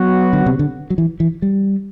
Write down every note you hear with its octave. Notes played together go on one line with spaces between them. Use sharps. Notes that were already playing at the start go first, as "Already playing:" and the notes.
Already playing: F#3 B3 F#4
D3
C3
D3
F#3
E3
E3
G3